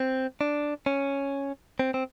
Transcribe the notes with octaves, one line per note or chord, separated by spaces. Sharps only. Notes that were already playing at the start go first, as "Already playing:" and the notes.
Already playing: C4
D4
C#4
C4
C4